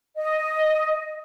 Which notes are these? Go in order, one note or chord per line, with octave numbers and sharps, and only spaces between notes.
D#5